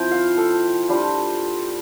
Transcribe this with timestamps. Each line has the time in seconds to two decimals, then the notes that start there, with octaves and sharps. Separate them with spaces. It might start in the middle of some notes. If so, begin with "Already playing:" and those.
Already playing: F3 C4 E4 G5
0.11 F5
0.38 A4
0.89 G3 D4 F4